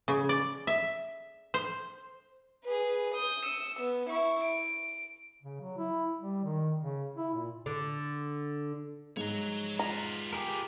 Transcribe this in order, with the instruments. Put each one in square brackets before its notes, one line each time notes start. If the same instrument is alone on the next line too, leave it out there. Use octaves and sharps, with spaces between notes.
[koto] C#3
D5
E5
C5
[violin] G#4 B4
D#6 G6
E6 C#7
B3
E4 C#6
D7
[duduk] C#3
F#3
E4
G3
D#3
C#3
E4
A#2
[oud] D3
[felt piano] G#2 [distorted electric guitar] C#5 A#5
[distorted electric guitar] B3 F4 [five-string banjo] A#5
[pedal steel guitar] G4 G#4 A#4